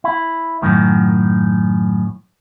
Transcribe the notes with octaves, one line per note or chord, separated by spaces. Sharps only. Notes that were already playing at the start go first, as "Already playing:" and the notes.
E4
F#2 A2 D#3